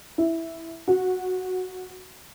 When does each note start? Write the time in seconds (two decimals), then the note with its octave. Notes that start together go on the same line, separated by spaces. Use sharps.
0.18 E4
0.88 F#4